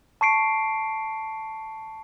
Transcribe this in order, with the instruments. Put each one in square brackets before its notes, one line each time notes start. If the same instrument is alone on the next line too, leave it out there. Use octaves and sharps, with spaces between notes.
[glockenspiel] A5 C#6 C7 D7